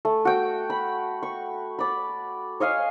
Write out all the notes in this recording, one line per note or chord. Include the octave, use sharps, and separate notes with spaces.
A3
F#4 G5
B5
C#6
D5 B5
C#5 D#5 F5 G#5